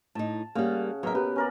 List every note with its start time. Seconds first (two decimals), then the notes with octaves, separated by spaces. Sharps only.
0.15 A2 D#4 A5
0.55 C#3 G3 A#3 F#5
1.03 B2 F#3 A#4 E5
1.15 G4 B4
1.36 C#4 A#4 D5